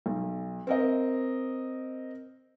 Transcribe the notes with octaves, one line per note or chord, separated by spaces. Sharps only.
B1
C4 A#4 D#5